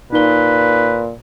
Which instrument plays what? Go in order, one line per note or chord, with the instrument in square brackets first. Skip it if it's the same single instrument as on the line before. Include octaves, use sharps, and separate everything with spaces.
[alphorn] A#2 [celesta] D#4 G7 [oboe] B4